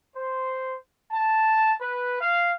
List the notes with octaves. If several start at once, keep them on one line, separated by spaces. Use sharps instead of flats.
C5
A5
B4
F5